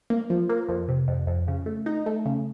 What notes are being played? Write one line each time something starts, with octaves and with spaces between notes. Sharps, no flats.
A#3
F3
A#3
F2
C3
F2
F2
C#3
A3
D#4
A3
C#3